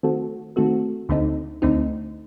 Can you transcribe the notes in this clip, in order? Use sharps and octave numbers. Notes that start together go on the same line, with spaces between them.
D#3 A3 C4 F#4 A4
D#3 A3 C4 F#4 A4
D2 D3 A3 C4 D#4
D2 D3 A3 C4 D#4